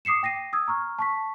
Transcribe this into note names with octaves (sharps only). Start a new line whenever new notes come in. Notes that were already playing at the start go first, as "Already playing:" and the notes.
D6 D#6 C7 C#7 E7
G5 A#6 C7 D#7
D#6 E6 G#6
A#5 C#6 F6
A5 C#6 B6